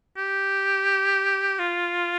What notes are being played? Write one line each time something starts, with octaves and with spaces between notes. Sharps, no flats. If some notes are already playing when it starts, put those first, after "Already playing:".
G4
F4